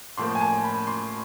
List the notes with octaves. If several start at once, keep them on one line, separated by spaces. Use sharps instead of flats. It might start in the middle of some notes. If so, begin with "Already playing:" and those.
A2 F3 A#3 C6
G#5
A5
B5
C6